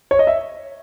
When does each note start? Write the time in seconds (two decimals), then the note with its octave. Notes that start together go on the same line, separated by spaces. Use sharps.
0.11 C#5
0.19 D#5
0.27 E5